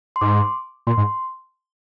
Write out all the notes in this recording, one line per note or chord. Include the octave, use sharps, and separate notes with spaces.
C6
G#2 D6
A#2 C6
G#2